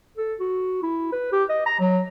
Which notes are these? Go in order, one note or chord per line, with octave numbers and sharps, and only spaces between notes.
A4
F#4
E4
B4
G4
D#5
A#5
F#3